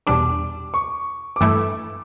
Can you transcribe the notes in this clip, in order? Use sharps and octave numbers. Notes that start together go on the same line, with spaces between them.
E2 B2 G3 D4 D6
C#6
D6
G2 E3 A3 E4 E6